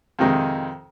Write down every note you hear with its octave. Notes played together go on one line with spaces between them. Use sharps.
F2 C3 D#3 G#3